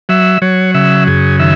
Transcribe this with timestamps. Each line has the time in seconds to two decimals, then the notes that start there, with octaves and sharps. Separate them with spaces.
0.09 F#3 E5
0.42 F#3 C#5
0.74 C#3 E5
1.07 F#2 G#4
1.39 D#3 E5